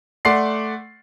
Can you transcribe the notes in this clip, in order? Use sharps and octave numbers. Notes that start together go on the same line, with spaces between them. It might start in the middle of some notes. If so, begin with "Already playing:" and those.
A3 D5 F#5 C6 C7